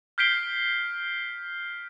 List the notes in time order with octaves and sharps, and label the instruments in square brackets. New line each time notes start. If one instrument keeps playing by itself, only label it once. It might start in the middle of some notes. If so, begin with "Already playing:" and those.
[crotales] F6 G6 B6 C7 D7 G7